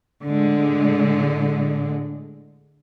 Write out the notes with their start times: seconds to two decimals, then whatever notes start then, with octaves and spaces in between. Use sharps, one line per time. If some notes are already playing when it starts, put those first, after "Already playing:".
0.25 A2 D3 G#3